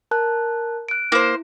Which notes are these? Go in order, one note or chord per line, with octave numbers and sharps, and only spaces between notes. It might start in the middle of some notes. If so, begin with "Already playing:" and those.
A#4 A5 F#6
F#6 D7
A#3 E4 C5